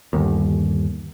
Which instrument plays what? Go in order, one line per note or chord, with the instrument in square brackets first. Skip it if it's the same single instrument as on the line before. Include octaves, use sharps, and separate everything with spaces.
[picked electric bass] G1 D#2